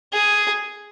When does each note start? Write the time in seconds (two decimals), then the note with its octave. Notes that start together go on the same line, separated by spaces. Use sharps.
0.13 G#4